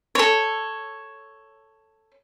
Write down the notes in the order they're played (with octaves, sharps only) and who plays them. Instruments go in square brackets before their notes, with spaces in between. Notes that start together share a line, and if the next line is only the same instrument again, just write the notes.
[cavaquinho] A4 C#5